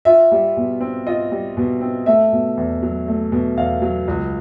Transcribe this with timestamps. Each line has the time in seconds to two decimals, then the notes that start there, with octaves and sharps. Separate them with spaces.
0.05 F4 E5
0.32 G3
0.57 B2
0.81 C4
1.07 F4 D#5
1.31 G3
1.57 B2
1.81 C4
2.06 A3 E5
2.32 B2
2.57 E2
2.82 F#3
3.08 A3
3.32 B2
3.57 E2 F5
3.82 F#3
4.08 C#2